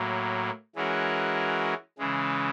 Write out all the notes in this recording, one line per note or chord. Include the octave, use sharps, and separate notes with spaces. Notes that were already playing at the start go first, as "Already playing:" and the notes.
Already playing: A2 F#3 A#3
E3 G#3 C#4 F#4 A#4
C#3 E3 G#3